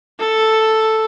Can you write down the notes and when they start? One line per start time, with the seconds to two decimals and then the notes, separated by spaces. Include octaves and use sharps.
0.19 A4